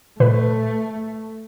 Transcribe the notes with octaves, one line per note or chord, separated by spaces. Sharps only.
A#2 A3 B4